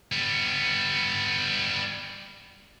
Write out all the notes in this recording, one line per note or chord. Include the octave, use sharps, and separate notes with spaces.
G3 B3